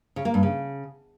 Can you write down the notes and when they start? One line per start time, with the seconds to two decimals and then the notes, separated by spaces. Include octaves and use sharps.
0.16 C#3
0.25 A#3
0.34 G2
0.43 C#3